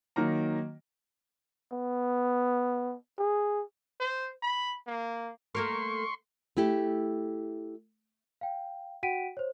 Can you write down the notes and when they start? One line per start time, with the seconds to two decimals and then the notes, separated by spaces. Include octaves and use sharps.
0.16 D#3 F#3 A#3 A#5
1.72 B3
3.19 G#4
4.00 C5
4.43 B5
4.87 A#3
5.55 A3 A#3 A#4 C6 C#6
6.57 A3 E4 G4
8.41 F5 G5
9.03 F#4 F#5 G5 B6 D7 D#7
9.37 C5 C#5